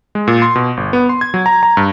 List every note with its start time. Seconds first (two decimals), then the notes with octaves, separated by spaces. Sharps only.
0.15 G#3
0.27 A#2
0.42 C6
0.55 B2
0.77 G1
0.93 B3
1.09 C6
1.21 G#6
1.34 F#3
1.46 A#5
1.63 A#5
1.77 G2